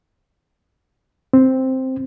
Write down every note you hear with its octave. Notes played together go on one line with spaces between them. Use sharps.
C4